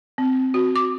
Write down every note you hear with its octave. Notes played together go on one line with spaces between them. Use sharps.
C4
F#4
D6